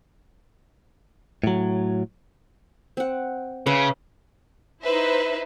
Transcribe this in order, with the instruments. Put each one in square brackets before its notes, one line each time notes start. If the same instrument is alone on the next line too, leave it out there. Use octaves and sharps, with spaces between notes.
[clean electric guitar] A2 F#3
[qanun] C4 F#5
[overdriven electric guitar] C#3 [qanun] C#4 B4 E5
[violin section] D#4 E4 B4 C5 E5